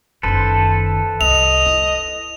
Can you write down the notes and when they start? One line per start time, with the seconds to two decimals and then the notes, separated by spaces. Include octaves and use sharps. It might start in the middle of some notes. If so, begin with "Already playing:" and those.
0.23 F#1 D#3 A4 B4 C5
1.21 C2 D#5 F7
1.66 E4